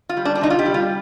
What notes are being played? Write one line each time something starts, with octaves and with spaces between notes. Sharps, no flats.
F4
G3
D4
D4
C3 D#4
F4
G4
G3
F4